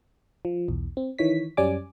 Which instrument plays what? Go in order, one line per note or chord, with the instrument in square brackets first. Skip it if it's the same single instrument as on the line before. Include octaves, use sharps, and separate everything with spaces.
[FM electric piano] F3
B1 E2
C4
D#3 E3 C#5 B6
F#2 G3 C#4 D5 G#5 D6